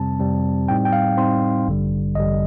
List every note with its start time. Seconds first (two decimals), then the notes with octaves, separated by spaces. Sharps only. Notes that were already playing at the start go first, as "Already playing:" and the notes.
Already playing: F2 C3 G3 C4 A5
0.19 F2 C3 G3 C4
0.68 A2 G3 C4 D#4 G5
0.85 G5
0.93 F5
1.17 A2 G3 C4 D#4 C6
1.67 A1 G2 D3 G3
2.15 A1 G2 D3 G3 D#5